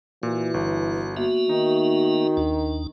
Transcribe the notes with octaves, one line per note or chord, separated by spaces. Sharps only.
A#2 E3 F#4
G1
A#3 B3 F#4 E5
D#3 D#4
D#2 D4